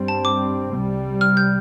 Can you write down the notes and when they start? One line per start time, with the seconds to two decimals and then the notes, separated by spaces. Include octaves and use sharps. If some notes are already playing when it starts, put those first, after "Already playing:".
Already playing: G2 G3 C4
0.08 A5
0.25 D6
0.73 C2 C3 G3
1.21 F6
1.37 G6